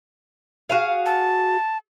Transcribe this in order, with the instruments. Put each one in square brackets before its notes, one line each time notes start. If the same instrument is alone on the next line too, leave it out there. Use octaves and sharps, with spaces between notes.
[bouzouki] F#4 G#4 F5
[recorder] A5